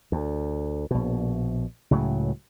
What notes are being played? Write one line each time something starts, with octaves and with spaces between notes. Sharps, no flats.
D2
A#1 B2
C#2 A2 C#3 F#3